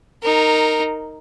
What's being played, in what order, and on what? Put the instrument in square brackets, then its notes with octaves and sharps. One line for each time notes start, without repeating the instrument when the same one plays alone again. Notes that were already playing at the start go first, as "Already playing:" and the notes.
[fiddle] D#4 A#4